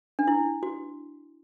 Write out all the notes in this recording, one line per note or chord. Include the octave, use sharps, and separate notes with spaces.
D4
E4
F#4